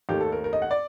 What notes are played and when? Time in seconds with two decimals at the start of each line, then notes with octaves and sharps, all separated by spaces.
0.09 D#2 D#3 A3 G4
0.21 A4
0.32 A#4
0.44 A#4
0.53 D#5
0.62 F#5
0.71 D5